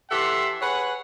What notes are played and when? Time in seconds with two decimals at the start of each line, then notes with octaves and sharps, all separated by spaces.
0.10 E3 G4 A4 E5 F#5 C6
0.61 G#4 B4 C#5 F#5